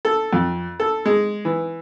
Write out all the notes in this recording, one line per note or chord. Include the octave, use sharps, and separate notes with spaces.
A4
F2
A4
G#3
E3